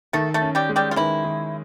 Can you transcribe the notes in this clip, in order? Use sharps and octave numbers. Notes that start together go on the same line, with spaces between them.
D#3 A3 A4
A3 A4
C#4
G3 G4
G#3
G3 G4
F4
D#3 E3 E4
D#3